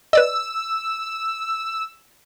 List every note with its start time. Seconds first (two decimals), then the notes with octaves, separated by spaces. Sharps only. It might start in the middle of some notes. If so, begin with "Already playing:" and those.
0.13 B4 D5 D#5 E6